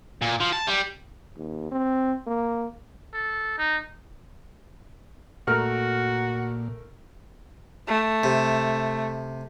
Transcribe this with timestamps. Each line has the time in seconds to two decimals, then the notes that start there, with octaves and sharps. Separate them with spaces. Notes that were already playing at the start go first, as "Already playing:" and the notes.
0.22 A#2
0.40 F3
0.53 A5
0.67 G3
1.37 D#2
1.72 C4
2.27 A#3
3.13 A4
3.58 D#4
5.48 A#2 A3 F#4 A#4 F6
7.87 A3
8.24 C3